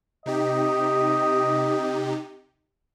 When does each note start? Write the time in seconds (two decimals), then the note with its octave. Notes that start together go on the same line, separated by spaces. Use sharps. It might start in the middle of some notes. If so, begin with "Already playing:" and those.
0.26 C3 D#4 G4 D#5